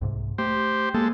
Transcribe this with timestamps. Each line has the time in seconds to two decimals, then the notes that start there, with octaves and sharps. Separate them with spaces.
0.01 C2 G#2 C3
0.38 A3 G4 C5
0.94 G#3 A#3 A4